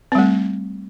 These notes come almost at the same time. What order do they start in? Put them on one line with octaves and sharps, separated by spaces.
C4 G3 A3